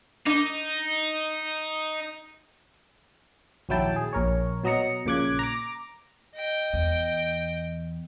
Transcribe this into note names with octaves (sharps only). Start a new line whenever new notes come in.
D4 D#4
A#1 D#2 F#3 E4 G5 A5
G#4
A#1 A#4 C#5
B2 F#3 D#5 A#5 C#7
A#1 A#2 C#3 D6 F#6 G#6
A#5 D6
D#5 G5
E2